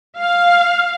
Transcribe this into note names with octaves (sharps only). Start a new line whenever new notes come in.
F5